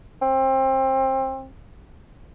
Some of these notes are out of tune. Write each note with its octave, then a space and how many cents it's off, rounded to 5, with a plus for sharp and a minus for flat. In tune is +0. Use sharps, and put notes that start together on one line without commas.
C4 +25